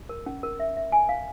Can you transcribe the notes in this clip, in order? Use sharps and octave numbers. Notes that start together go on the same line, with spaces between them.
A#4
C#4
A#4
E5
E5
G#5
F5